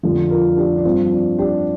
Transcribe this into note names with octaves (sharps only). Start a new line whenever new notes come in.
F2 D3 F3
F4 A#4
D4 G4
D4
G2 F3 C4 F4
D4
D4 G4